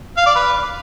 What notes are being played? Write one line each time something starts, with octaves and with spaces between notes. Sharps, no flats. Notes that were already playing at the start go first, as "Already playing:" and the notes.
F5
D5
B4